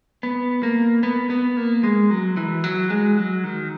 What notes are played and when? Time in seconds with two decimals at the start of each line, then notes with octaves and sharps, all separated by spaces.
0.23 B3
0.63 A#3
1.03 B3
1.30 B3
1.57 A#3
1.84 G#3
2.10 F#3
2.37 E3
2.64 F#3
2.90 G#3
3.18 F#3
3.44 D#3